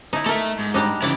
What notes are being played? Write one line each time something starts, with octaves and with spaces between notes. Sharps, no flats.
D#4 E4
A3 A4 A#4 E5
G#2
G3 D4 D#4
C#3 E3 E4 D5